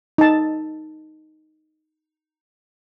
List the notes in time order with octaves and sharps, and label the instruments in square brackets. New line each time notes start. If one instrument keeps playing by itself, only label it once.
[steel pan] D#4 A5